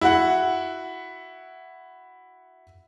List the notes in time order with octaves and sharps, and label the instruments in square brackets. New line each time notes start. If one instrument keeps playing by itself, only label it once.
[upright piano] E4 F#4 F#5